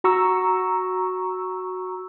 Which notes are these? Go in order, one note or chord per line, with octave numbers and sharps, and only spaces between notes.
F#4 A#5 C#6 E6